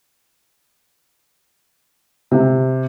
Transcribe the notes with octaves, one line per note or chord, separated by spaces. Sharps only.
C3